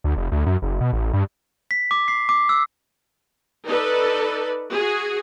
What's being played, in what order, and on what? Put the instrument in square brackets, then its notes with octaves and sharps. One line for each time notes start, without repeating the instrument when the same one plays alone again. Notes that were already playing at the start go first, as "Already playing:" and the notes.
[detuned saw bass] D2
F1
D2
F#2
F#1
B2
A1
G2
[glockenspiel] B6
D6
C7
D6
E6
[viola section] D#4 A4 B4 D5
F#4 G#4